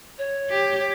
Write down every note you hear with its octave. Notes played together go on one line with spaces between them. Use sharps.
C#5
G4